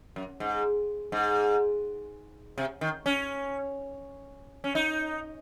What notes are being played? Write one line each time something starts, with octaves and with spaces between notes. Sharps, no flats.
F#2
G#2
G#2
C3
D#3
C#4
C#4
D#4